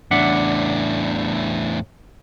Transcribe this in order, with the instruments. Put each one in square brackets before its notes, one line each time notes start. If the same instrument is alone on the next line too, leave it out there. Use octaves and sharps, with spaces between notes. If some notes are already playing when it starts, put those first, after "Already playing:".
[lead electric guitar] E2 A2 [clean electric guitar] D4 E5 F#5